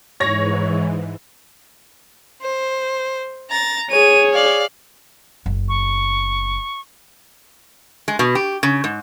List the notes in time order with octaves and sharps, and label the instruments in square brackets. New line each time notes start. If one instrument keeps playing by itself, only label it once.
[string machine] G#2 E3 [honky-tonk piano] C#5 A#6
[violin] C5
A#5 A6
[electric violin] G#4 C#5 [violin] D#7
[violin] D5 F5
[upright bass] F#1 B3
[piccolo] C#6
[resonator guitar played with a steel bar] G#3
B2
G4
C#3
G#2